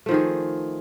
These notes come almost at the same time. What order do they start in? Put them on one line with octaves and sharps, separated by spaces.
A3 F3 D#3 G#4